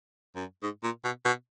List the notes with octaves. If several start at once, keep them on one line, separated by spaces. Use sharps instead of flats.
F#2
G#2
A#2
B2
B2